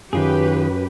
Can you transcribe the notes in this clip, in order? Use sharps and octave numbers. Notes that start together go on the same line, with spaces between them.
F#2 D#3 F4 G4 G#4 B4